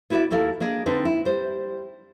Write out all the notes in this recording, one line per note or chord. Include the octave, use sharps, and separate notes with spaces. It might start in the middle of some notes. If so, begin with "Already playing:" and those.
B3 E4 F#4 C#5 D5 E5
D#2 A#3 E4 A4 F5
A#3 D4 G#4 D#5
D3 C4 D4 D#4 B4
E4
G3 C5